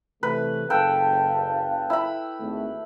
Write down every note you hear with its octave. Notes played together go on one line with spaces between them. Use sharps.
C3 E3 A3 B4
F#1 A4 B4 F5 G5 A5
E4 B5
G#1 A3